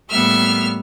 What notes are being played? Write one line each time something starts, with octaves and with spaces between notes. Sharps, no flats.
A2 G3 A#3 B3 E5 F6